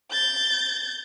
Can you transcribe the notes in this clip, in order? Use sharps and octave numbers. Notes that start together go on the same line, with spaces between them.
G6 A6